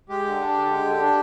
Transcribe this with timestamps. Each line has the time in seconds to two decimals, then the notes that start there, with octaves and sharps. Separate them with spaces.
0.09 G#3 G4
0.25 D3
0.40 D4
0.54 D3
0.70 G#3
0.85 D3
1.00 D4